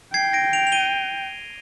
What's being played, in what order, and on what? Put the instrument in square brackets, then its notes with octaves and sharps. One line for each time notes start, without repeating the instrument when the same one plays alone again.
[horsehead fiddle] G5 [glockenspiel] G#6 C7
[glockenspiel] A#6 D7
D7 F7
F7
D#7 G7